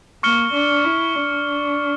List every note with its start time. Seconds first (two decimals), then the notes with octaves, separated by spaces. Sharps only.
0.23 A#3 C#6 F6 C#7 G7
0.54 D4
0.85 E4
1.15 D4